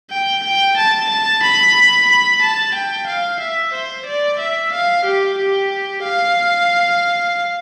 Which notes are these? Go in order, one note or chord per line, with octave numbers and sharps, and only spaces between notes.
G5
G5
A5
A5
B5
B5
A5
G5
F5
E5
C5
D5
E5
F5
G4
G4
F5